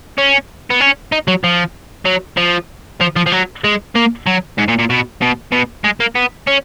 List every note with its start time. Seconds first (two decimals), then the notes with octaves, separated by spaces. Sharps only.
0.18 C#4
0.70 B3
0.81 C#4
1.12 D#4
1.28 F#3
1.44 F3
2.06 F#3
2.37 F3
3.01 F3
3.16 F3
3.26 F3
3.32 F#3
3.64 G#3
3.96 A#3
4.26 F#3
4.58 G#2
4.68 A#2
4.79 A#2
4.90 B2
5.21 B2
5.52 B2
5.84 G#3
6.00 A#3
6.15 B3
6.47 C#4